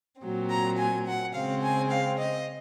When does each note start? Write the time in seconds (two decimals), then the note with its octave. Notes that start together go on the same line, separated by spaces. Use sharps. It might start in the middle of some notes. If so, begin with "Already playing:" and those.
0.22 A#2 F#3 C4
0.50 A#5
0.78 G#5
1.06 F#5
1.34 C#3 G#3 C4 F5
1.61 G#5
1.90 F5
2.18 D#5